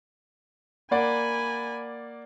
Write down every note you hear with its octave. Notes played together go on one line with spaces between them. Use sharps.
A#3 D5 F#5 G#5 B5